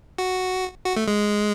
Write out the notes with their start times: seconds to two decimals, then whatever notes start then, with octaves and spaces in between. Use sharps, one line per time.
0.18 F#4
0.86 F#4
0.96 A3
1.08 G#3